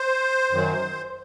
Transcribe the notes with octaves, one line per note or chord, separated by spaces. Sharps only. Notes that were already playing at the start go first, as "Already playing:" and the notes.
Already playing: C5
F#2 D#3 F#3